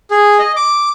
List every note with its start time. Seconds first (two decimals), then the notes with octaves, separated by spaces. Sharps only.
0.11 G#4
0.39 D#5
0.56 D6